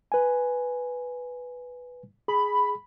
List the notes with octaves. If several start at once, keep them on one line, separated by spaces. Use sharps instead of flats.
B4 G#5
G#4 B5